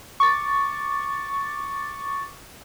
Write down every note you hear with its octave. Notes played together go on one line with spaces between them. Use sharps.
C#6 D6 A6